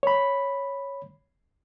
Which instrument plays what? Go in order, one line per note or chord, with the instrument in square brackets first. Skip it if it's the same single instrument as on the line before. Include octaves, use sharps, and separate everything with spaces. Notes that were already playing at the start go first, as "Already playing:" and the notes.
[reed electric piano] C#5 B5